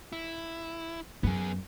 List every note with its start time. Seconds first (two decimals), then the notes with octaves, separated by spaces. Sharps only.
0.12 E4
1.23 F#2 B3 G#4